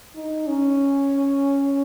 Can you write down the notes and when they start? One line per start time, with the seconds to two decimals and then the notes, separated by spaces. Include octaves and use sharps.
0.16 D#4
0.47 C#4